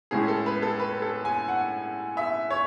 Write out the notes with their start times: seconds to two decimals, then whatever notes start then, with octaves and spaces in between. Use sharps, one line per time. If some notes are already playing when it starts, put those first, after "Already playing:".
0.11 A2 G#3 C#4 E4 G#4
0.28 A4
0.46 B4
0.62 A4
0.80 B4
1.02 A4
1.25 G#5
1.48 F#5
2.17 E5
2.51 C#5